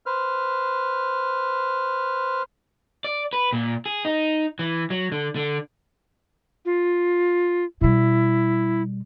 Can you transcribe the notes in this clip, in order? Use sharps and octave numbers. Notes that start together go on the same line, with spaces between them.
B4 C5 F6
D5
B4
A#2
G#4
D#4
E3
F#3
D3
D3
F4
B2 G3 E4